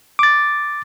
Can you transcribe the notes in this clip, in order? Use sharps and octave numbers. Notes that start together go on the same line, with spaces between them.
D6 A6